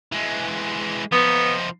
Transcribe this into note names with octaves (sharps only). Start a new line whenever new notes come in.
E3 G#3
F3 B3 D#4